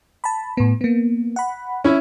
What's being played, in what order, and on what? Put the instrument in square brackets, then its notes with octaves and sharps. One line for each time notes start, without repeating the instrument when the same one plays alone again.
[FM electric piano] A5 B5
A2 B3
A#3 B3
F#5 B5
[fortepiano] C#4 E4